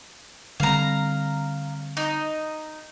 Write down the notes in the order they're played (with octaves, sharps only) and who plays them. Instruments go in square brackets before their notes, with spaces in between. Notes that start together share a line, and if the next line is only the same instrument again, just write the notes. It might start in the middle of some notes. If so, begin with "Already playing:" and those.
[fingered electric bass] D3 G3 C4 [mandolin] F5 A#5
[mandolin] D#4